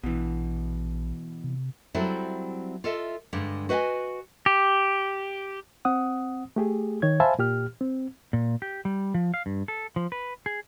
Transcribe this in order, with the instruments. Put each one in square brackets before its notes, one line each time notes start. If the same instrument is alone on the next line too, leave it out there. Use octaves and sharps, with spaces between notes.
[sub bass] A#1 [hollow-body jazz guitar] B2 E3
[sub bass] C3
[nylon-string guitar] F#3 G3 C4 E4 A4
F4 A4 D#5 E5
G2 D3 G#3
F#4 B4 D#5 F5 G#5
[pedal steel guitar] G4
[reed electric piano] C4 F#5 D#6
A3 G4 G#4
D#3 C#5 G#6
C5 E5 F5 G#5 A5 B5
A#2 G4 F6
C4
[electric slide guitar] A#2
G4
G3
F3
F5
G2
A4
F3
B4
G#4